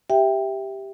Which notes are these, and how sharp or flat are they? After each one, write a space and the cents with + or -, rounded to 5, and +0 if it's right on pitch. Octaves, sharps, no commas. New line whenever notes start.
G4 +0 E5 +0 G5 +10